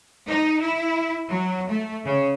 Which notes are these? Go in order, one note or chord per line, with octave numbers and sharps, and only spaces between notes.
D#4
E4
F#3
A3
C#3